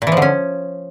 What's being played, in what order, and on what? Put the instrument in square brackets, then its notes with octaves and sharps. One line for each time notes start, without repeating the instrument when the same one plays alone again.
[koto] A#2
E3
F3
D3
C#4